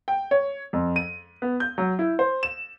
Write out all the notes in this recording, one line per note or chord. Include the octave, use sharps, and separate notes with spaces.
G5
C#5
F2
D#7
B3
G6
F#3
E4
C5
E7